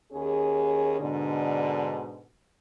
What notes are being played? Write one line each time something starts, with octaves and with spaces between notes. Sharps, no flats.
D#2 C#4 G#4
G#2 B2 D3